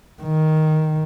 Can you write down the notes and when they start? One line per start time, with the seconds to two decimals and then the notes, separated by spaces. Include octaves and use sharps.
0.23 D#3